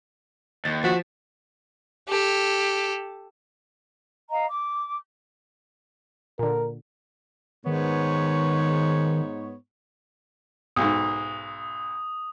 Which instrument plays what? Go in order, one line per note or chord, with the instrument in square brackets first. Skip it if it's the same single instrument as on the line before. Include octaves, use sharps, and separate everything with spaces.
[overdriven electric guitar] D#2 [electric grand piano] A6
[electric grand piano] F3 B6 E7 [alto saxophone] F#4
[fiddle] G4 A4
[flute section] D#5 F5 A#5
D6
[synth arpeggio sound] A#2 D3 [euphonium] A#4
[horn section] G#2 B3 C#5 [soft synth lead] D#3
[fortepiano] B1 G#2 [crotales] D#6